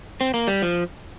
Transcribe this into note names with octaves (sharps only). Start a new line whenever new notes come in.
C4
A#3
G3
F3